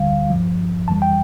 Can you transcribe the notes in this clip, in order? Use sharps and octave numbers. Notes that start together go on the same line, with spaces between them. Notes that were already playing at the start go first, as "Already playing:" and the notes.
Already playing: D2 D3 G3 F5
G2 F3
F2 E3 G3 A5
G5